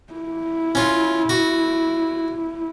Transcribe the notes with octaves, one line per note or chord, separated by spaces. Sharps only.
E4
C#4 F4
F#4